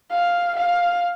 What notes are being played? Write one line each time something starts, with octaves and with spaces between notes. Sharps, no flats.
F5
F5